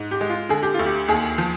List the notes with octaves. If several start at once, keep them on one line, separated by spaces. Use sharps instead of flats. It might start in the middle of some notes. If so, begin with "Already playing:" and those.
Already playing: G#2
G4
G#3
F4
D3 G#4
G4
D2 F4
G4
D#2 G#4
F3